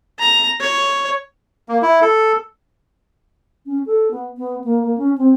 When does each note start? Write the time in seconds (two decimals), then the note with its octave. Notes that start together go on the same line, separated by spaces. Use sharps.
0.19 A#5
0.60 C#5
1.69 A#3
1.82 E4
2.02 A4
3.66 C#4
3.86 A4
4.11 B3
4.37 B3
4.64 A#3
4.83 A#3
4.98 C#4
5.18 C4